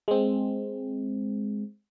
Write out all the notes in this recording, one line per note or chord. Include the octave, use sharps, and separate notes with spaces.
G#3 C4